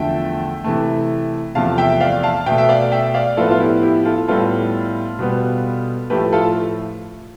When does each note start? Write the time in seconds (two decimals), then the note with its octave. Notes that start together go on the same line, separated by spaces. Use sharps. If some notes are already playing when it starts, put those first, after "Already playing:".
Already playing: E2 D3 F3 A3 E5 G5
0.64 C3 E3 A3
1.55 E2 C3 F3 A3 F5 A5
1.78 E5 G5
2.01 D5 F5
2.23 F5 A5
2.46 B2 A3 E5 G5
2.58 E5
2.69 D5 F5
2.92 E5 G5
3.14 D5 F5
3.37 A2 F3 B3 F4 A4
3.51 F4
3.60 E4 G4
3.83 E4 G4
4.05 F4 A4
4.28 A2 G3 B3 F4 A4
5.19 B2 G3 B3
6.10 A2 F3 A3 G4 B4
6.33 F4 A4